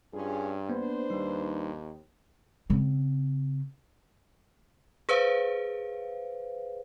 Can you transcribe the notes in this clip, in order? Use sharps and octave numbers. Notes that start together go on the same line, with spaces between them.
G2 C#4 F4 G#4
A#3 B3 D4 B4 C5
D#2 G3 D#4
C#3 C4
G#4 B4 C5 F5